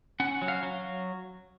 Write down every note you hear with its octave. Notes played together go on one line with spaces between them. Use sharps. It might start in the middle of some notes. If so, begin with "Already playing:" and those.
C#4 F#5
F#3
F5
F#3